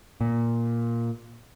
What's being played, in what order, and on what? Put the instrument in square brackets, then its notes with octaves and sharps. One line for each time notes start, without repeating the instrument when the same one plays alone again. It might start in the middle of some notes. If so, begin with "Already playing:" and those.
[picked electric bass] A#2